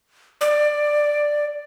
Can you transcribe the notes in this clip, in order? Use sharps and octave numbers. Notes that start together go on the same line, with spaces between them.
D5